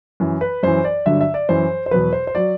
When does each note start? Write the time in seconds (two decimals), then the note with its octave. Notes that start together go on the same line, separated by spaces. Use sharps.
0.20 F#2 E3
0.41 B4
0.63 F#2 E3 C5
0.84 D5
1.05 G2 D3 F#3 E5
1.21 E5
1.34 D5
1.49 F#2 E3 C5
1.86 C5
1.91 E2 B2 F#3 B4
2.13 C5
2.27 C5
2.35 F#3 D5